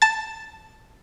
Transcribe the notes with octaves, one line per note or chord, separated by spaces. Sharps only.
A5 A6